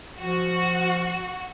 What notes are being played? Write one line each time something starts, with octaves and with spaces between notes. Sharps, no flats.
F3 F#4